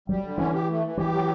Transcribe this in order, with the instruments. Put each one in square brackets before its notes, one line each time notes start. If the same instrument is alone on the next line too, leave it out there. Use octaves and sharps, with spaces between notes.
[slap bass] F#3 [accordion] G3
[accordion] D3
[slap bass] E3 [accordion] C#4
[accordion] G4
A3
E3
[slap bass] E3 [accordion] G4
[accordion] F#3